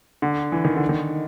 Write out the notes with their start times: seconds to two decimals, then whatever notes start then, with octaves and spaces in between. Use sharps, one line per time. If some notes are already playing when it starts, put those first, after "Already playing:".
0.22 D3
0.52 E3
0.65 D#3
0.77 D3
0.89 D#3